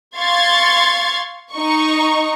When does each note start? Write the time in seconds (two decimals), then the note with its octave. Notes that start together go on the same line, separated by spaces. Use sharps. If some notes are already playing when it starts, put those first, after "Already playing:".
0.18 F5 C6 C#6 G#6 A6
1.54 D#4 C#6